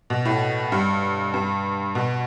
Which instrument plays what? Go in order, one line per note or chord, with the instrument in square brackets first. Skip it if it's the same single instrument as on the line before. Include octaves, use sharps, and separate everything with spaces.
[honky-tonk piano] B2
A2
G2
G2
B2